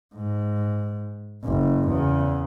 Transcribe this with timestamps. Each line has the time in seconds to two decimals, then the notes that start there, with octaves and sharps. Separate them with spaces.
0.15 G#2
1.44 F#1
1.89 E2 C#3